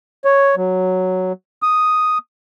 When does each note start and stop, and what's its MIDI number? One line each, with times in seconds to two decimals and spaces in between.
0.25 0.55 73
0.57 1.33 54
1.63 2.18 87